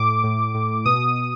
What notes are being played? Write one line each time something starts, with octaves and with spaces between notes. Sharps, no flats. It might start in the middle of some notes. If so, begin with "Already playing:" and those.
Already playing: A2 D6
A2
A2
B2 D#6